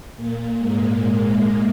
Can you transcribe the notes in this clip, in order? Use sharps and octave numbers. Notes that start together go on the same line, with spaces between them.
A#2 A#3
G#2 G#3